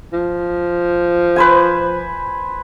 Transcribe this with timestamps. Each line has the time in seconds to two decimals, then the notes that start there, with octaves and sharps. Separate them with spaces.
0.13 F3
1.36 B4 C5 G#5